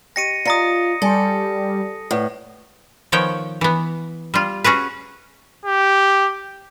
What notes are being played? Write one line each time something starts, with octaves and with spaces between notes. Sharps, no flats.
G4 D#5 G5 A#6 C#7 D#7
F4 D5 D#5 A#5 D#6 A#6 C#7
G3 A4 D5 G#5 C6
A2 B4 D5 F#5
D#3 F3 B3 C#5 G5
E3 B3
G3 F4
C#4 F#4 G#4 B4
G4